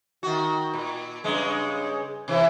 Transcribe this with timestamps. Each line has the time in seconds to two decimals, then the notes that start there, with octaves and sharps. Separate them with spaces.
0.23 D#3 F#4
0.73 A#2
1.24 G2 C#3 G#3
2.28 C3 E3 E4